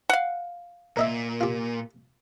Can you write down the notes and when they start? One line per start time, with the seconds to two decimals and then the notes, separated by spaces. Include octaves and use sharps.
0.09 F5 F#5
0.97 A#2 A#4 D#5 E5
1.41 F4 G4